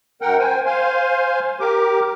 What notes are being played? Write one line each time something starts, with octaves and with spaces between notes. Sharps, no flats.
F#2 A#4 F#5 G5
C5 G5 G#5
C5 F5 G#5 C6
G4 A#4 D6